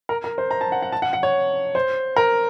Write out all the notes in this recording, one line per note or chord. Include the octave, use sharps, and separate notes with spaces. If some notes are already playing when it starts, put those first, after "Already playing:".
A#4
A#4
C5
A#5
A5
F#5
F#5
A5
F#5
F#5
C#5
C5
A#4